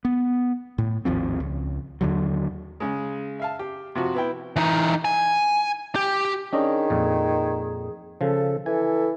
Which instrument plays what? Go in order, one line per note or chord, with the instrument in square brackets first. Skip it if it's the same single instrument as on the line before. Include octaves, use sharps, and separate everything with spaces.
[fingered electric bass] B3
A2
G#1 D#2 F3 C4
C#2
D#2 D3 F#3
[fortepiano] C#3 G#3
E5 F5 A5
G4
C3 F3 F#4
B3 E4 G5
[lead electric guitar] E3 D#4
G#5
G4
[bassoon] D#3 [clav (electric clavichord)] C#4 D4 D#5 [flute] G#4
[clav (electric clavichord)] F2 A#2
[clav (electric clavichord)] C#3 F3 [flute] A4
[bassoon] E3 [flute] A4 [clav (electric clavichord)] G#5